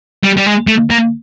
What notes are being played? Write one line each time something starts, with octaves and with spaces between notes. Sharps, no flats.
G3
G3
G#3
A3
A#3